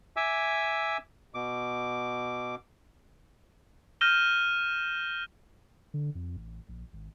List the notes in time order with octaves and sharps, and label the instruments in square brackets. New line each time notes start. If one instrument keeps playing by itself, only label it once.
[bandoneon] E5 G#5 D6 E6
B2 D6
[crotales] F6 G6 A#6 D#7 E7 G7
[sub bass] D3
F2
A1
A#1
G#1